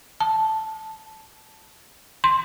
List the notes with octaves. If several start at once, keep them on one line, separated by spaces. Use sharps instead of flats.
A5
C6